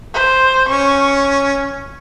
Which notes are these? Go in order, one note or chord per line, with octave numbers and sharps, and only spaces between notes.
C5
C#4 C#6